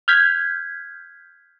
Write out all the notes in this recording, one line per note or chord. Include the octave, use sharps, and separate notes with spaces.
F6 G6 G#6 B6